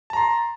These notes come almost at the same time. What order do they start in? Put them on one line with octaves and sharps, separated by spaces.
A5 A#5 C6